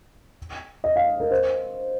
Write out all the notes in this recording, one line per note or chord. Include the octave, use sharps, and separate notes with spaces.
D#5
F5
A#4
C5